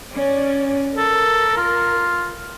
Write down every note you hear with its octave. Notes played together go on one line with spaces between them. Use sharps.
C#4 D5
A4 A#4
F4